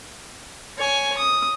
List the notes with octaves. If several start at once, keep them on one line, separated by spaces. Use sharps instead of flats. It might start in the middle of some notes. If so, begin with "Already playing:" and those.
C#5 G#5
D#6